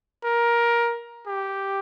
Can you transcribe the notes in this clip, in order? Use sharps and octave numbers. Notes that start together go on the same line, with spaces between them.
A#4
G4